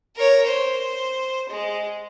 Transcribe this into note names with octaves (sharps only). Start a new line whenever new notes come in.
A#4 C#5
C5
G#3